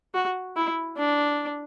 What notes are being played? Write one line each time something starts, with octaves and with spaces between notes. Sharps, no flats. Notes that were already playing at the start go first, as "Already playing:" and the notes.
F#4
E4
D4